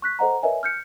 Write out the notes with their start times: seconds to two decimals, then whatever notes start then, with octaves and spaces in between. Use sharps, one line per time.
0.02 C#6 F#6 B6
0.19 A4 C5 D#5 F#5 A#5
0.43 A#4 B4 C#5 D#5 E5 G#5
0.63 F6 G6 C#7